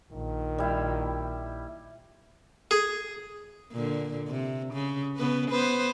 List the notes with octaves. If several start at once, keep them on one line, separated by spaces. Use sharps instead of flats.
A#1 D#3
G3 E4
G#4
A#2 D3
C3
C#3
C#3 B3 B4
B3 B4 C5